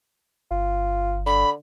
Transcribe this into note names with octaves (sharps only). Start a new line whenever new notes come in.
G1 F4
D3 B5